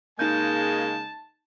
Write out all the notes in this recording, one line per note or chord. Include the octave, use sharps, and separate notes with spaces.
C#3 G#3 A#3 D#4 A5 G6